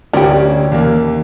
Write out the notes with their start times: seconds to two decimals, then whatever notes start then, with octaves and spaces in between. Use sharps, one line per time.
0.13 D2 C#4 G4 A#4 D5
0.72 D#2 A#3